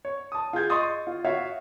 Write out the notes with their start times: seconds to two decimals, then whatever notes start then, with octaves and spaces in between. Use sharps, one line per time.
0.05 C#5
0.32 A5 D#6
0.53 F4 G#4 G6 G#6
0.70 D#5 C6 C#6 D#6 A6
1.07 F4
1.25 F#4 C#5 E5 F5